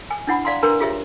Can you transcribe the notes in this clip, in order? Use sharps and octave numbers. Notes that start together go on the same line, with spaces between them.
G#5
D4 E4 F#5 B5
D5 F5 A#5 C6
D4 A#4 B4 A#5 C6
F4 G4 G#4 C#5 E5